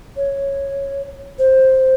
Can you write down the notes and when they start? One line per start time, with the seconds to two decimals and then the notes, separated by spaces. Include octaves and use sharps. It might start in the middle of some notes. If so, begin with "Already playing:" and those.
0.17 C#5
1.39 C5